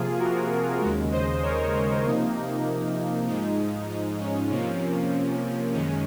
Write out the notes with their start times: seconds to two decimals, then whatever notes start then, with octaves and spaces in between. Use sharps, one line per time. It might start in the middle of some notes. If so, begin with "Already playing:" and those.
Already playing: C3 F3 A#3 F4 G#4
0.18 F#4 A#4
0.80 D#2 C#3 G#3 F#4 A#4
1.12 C5 D#5
1.42 A#4 C#5
2.04 C3 F3 A#3 D#4
3.27 G#2 F3 G#3 D#4
3.89 D#4
4.20 C#4
4.50 C3 F3 A#3
5.73 F#2 D#3 G#3 C#4